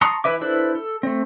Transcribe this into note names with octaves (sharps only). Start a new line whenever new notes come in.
A5 A#5 C6 C#6 D#6
E3 E4 B4 E5 D6
D4 E4 A4 B4 C5
A4
A3 C4